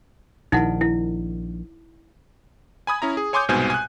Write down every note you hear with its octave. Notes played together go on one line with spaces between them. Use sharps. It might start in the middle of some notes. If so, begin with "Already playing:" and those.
A#1 D#3 D#4 E4 F#5
E4
G#5 B5 D#6 G#6
C#4 E4 A#5
G#4
C#5 G#5 C6 D6 D#6 G6
C2 G#2 B2 C5 G#5
G#5 F#6